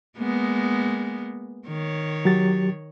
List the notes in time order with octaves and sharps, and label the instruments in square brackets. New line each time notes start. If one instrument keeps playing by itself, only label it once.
[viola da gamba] G#3 A#3 B3
D#3 C#5
[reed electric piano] F#3 G4 A6